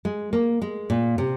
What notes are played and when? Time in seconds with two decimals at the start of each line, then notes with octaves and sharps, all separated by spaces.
0.05 G#3
0.33 A#3
0.62 G#3
0.90 A#2
1.18 C3